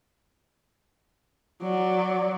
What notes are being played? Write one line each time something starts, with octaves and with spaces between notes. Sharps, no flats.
F#3 D5